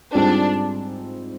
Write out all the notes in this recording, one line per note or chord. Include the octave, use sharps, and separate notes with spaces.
G#2 G3 C4 D4 F4 G#4